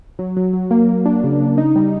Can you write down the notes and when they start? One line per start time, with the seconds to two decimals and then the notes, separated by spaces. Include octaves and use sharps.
0.19 F#3
0.37 F#3
0.53 F#3
0.71 A#3
0.89 A#3
1.06 D4
1.24 C#3
1.40 C#3
1.58 D#4
1.76 G3